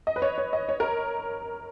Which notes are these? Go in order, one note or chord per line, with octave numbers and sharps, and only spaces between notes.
D#5
B4
C#5
C#5
D#5
C#5
A#4